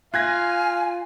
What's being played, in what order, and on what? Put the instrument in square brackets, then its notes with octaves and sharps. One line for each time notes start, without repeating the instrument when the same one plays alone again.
[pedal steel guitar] F4 [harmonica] F5 [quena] G#5 [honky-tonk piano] F#6 G#6 A#6